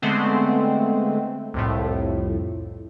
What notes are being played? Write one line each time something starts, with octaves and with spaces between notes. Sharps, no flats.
D3 G#3 A3 B3 C4
C2 F2 A2